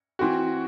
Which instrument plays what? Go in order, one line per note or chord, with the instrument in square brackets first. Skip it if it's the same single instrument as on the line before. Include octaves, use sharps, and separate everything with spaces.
[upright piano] E3 C4 F#4